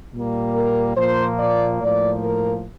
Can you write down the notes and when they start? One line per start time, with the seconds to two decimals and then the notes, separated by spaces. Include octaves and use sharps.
0.13 A#2 G3 A#3
0.54 A#4
0.97 A#2 F3 A#3 C5
1.39 D5
1.82 A2 F3 A#3 D5
2.24 A#4